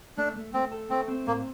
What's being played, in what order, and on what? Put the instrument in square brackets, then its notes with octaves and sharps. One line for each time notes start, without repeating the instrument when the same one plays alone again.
[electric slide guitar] A3 [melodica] D4
[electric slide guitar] A3
[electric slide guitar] A3 [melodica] C4
[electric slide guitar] A4
[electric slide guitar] A3 [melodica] C4
[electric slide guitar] C4
[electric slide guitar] A2 [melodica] A#3